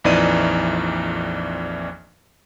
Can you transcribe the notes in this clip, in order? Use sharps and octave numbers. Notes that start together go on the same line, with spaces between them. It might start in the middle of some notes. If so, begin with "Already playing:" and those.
A#1 F2 E3 D#4 D5 D#7